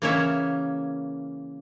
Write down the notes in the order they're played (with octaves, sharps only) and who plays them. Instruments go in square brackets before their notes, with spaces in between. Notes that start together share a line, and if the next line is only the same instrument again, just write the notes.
[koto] C#3 E3 A#3 C#4 C#5 E5